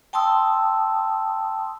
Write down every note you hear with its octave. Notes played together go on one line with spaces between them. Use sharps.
G5 A5 C6 D#6 E6